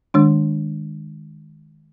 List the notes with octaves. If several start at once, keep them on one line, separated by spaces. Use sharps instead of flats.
D#3 G#3 D4